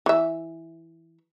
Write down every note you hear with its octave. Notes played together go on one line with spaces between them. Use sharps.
E3 E5